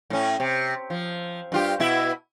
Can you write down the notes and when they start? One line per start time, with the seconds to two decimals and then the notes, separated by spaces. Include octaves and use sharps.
0.10 A2 C#4
0.40 C3
0.90 F3
1.52 G2 F4 G4
1.80 B2 E4 E5